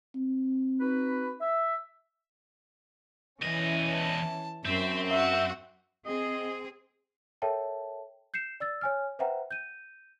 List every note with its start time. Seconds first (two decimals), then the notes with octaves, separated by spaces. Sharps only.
0.15 C4
0.79 D#4 F#4 B4
1.40 E5
3.43 E2 E3 C#4 D#5
3.93 A5
4.65 F#2 C4 C5 E5
5.11 F#4 E5
6.06 C4 G#4 D#5
7.42 A4 A#4 C#5 E5 G5 A5
8.34 G6 C7 C#7 E7
8.60 D5 E6 A6
8.81 C#5 G#5 F6
9.19 B4 C5 E5 F#5 G5 A#5
9.51 G6 D#7